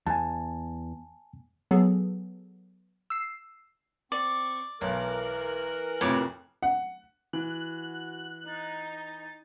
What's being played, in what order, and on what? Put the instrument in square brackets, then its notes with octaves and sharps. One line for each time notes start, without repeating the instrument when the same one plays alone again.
[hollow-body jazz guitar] E2 [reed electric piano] G#5 A5
[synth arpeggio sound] F#3 B3 G#4 A4
E6 C7
[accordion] C4 C#6 [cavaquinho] D5
[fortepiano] B1 [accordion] E3 A#4 F#6
[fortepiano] F2 A2 C3 [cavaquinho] C#5 D6
[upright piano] F#5
[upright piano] E3 [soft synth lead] F#4 [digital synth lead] F#6
[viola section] D#4 [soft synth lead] A6